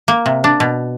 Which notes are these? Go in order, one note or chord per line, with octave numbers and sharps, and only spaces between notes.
A#3
C3
D4
B2